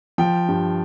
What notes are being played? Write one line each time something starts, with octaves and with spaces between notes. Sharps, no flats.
F3 G5
G2